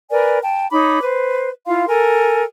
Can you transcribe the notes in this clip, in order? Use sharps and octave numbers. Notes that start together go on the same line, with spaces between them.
A#4 B4 D5 G#5
G5 A5
D#4 C#5 B5 D6
B4 C5
E4 F4 F5 C6
A4 A#4 G#5